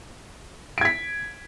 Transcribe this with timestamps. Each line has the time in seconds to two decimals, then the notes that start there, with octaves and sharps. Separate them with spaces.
0.78 D7
0.81 G#6
0.85 B6